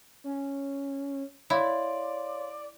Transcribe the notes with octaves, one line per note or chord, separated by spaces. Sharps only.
C#4
E4 C#5 D5 F5 C6